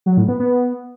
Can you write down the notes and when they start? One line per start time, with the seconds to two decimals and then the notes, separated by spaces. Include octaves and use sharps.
0.06 F#3
0.17 A2
0.28 B3
0.40 B3